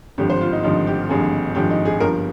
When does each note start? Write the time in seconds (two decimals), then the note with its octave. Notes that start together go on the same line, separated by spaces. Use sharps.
0.18 G#1 G2 D3 F3 G4
0.30 C5
0.41 F4
0.53 D#4
0.63 G#1 G2 D3 F3 D#4
0.87 G4
1.09 G#1 G2 D3 F3 G#4
1.55 G#1 G2 D3 F3 G4
1.71 D#4
1.85 G#4
2.00 G1 G2 F3 A#4